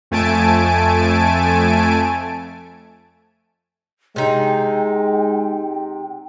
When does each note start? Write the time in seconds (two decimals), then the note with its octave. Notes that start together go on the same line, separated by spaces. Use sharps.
0.11 F2 A3 G#5 A5 D7
4.16 C3 G#3 D#4 G5